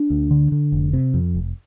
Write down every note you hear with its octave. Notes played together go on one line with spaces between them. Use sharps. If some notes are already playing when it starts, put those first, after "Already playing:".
Already playing: D4
D2
D3
D3
F1
C3
F2
F1